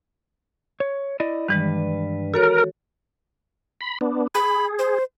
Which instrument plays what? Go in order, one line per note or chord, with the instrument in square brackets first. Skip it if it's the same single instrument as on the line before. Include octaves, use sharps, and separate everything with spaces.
[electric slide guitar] C#5
E4 D5 D#5
[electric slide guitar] G2 G3 B4 [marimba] D#3 E3 G#3
[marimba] F#4 A4 C#5 [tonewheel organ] A#4
[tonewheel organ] B5
B3 D4
[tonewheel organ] G#4 [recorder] B5
[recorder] C5